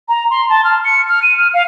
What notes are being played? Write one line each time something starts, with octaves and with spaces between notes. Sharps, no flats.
A#5
C6
A5
F6
C#7
F6
D#7
F6
F5